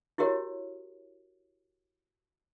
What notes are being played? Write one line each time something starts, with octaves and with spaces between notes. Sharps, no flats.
E4 F#4 G4 A#4 C#5